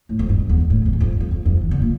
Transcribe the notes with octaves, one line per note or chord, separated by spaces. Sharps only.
A2
F2
G2
F2
E2
G2
A2
F2
E2
F2
G2
F2
F2
F2
E3
D3
A#2